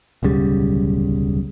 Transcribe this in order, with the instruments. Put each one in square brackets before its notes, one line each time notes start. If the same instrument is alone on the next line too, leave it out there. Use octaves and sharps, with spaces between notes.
[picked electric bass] D1 B1 C#3 G3